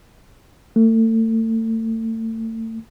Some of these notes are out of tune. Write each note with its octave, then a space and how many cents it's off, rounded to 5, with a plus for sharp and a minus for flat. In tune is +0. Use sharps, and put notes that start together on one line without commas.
A3 +35